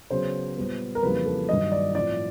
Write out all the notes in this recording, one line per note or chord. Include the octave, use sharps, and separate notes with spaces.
C#3 F#3 B3 C5
A#2 G3 B3
A#4
F2 C#3 E3 G3 A#3 B4
A4
G2 D#3 F#3 D#5
D5
A2 F3 A3 C4 D5